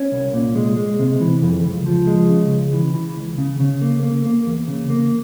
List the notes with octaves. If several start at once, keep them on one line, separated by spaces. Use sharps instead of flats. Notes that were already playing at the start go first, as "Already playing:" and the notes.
Already playing: C#4
C2
A#2
G#3
G#3
C3
E3
F2
C#2
F3
G#3
C#3
C#2
E3
E3
C#2
C#3
C#3
A#3
A#3
A#3
E2
C#3
A#3